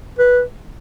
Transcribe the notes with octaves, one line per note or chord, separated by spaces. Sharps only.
B4